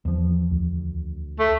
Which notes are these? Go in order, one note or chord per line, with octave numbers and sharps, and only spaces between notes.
E2 F3
D2
A3